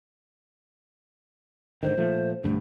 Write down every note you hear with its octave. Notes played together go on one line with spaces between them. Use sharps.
G#2 D3 D#3 C5
A#2 F3 A3
B1 G2 D3 A3